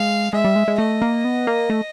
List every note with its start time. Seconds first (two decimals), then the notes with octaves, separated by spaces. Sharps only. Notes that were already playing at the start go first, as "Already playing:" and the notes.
Already playing: G#3 F5
0.33 G#3 E5
0.45 G3
0.56 G#3
0.68 G#3
0.78 A3 D#5
1.02 A#3
1.25 B3
1.47 A#3
1.70 A3